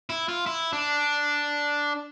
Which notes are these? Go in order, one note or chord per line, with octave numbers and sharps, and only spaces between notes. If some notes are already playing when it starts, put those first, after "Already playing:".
E4
F4
E4
D4